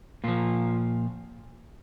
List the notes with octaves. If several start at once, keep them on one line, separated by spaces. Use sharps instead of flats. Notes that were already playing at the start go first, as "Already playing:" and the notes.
A#2 F3 F4